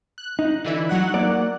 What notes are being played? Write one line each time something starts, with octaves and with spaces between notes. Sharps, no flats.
F#6
D#4
D3 E3 E4
F#3 F#5 F#6
A#3 D5